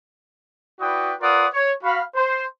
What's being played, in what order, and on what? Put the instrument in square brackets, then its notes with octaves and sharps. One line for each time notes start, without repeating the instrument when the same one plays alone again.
[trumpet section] E4 F#4 B4 D5 G5 D#6
F4 A#4 B4 D5 F#5 D#6
C#5
F#4 F5 B5
C5